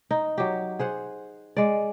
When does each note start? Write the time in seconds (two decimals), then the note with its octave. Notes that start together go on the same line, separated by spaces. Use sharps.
0.11 D#4
0.38 F#3 G4
0.79 G#4 C5 F#5
1.57 G#3 D5